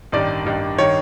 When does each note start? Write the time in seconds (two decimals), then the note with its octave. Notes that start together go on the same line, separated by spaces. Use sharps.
0.12 A1 G2 D#3 D5
0.45 A1 G2 D#3
0.78 D#3 C#5